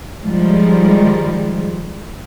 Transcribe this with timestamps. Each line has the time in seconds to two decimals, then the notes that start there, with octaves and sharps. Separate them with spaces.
0.24 D#3 F3 G3 G#3